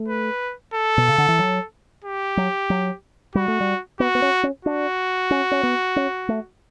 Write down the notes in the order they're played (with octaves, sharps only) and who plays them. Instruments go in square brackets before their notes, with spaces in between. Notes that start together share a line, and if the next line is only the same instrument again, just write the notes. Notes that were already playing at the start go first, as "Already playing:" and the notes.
Already playing: [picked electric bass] A3
[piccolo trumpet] B4
A4
[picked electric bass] B2
C#3
D3
E3
F#3
[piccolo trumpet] G4
[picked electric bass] F#3
F#3
[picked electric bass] G3 [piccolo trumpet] F#4
[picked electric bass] A3
G3
[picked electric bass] B3 [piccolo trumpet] F#4
[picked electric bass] B3
C#4
C#4
[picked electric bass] D4 [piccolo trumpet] F#4
[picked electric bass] C#4
C#4
B3
C#4
A3